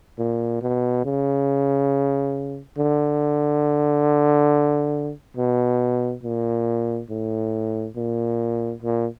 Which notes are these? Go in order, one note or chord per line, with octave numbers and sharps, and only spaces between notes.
A#2
B2
C#3
D3
B2
A#2
A2
A#2
A#2